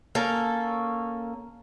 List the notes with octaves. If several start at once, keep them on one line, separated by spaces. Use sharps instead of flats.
A#3 C#4 A4